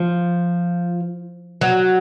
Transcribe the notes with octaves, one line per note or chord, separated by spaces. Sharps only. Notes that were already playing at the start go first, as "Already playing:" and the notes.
Already playing: F3
F#3